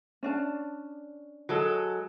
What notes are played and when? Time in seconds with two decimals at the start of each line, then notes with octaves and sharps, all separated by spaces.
0.23 C#4 D4 A5
1.49 F#3 G#3 A4